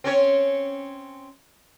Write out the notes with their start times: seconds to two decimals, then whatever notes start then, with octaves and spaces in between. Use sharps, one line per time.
0.04 C4 C#4 C#5